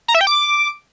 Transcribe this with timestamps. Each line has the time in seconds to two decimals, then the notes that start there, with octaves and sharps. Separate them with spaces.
0.08 A#5
0.15 E5
0.21 G5
0.27 D6